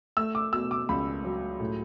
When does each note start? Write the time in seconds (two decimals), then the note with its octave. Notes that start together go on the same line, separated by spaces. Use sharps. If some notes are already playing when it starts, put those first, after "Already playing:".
0.17 A3 E6
0.35 D6
0.53 B2 E6
0.71 D6
0.89 C#2 B5
1.24 F#3
1.60 A2